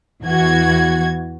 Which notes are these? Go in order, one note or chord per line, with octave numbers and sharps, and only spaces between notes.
E2 E3 F#4 G#6